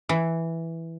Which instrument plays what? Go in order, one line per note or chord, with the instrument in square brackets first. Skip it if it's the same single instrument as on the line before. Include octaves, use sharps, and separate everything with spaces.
[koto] E3